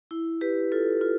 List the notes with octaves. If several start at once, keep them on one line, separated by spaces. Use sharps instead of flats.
E4
G4 B4
F4 A4
F4